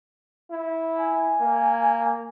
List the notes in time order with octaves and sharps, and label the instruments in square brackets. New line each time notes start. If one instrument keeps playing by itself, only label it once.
[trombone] E4
[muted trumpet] G#5
[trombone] A#3